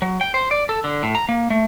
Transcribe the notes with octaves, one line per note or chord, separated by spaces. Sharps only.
F#3
G5
C5
D5
A4
D3
A2
A#5
A#3
A3